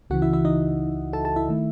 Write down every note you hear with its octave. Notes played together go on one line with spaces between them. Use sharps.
C#2 C#3 E3 F#4 F#5
E4 E5
E4 E5
D#4 D#5
A4 A5
A4 A5
E4 E5
D#3 A3